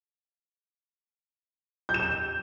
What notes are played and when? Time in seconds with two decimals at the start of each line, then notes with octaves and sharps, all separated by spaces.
1.89 G6
1.94 E7
2.00 G6